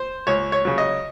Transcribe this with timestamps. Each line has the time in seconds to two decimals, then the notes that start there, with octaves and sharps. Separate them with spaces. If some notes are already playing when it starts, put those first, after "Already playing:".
Already playing: C5
0.27 C#2 C#5
0.52 C#5
0.65 C#3 F#3
0.78 D#5